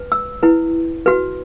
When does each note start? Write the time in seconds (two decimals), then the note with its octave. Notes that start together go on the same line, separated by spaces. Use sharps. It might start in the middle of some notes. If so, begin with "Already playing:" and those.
Already playing: B4
0.12 E6
0.43 E4 B4
1.06 F#4 B4